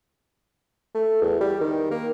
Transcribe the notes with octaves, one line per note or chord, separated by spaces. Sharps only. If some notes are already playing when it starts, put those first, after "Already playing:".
A3
E2
G3
D#3
A#3